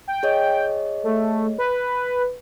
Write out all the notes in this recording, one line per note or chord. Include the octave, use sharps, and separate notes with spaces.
G5
G#4 C#5 D#5
A3
B4